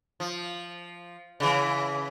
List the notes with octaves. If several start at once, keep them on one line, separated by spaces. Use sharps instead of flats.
F3
C#3 E3